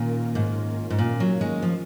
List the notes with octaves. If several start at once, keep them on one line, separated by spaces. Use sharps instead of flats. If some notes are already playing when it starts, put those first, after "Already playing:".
Already playing: A#2 D#3 A#3 C#4 F4 A#4
G#2
G#2
A#2
F#3
G#3
F3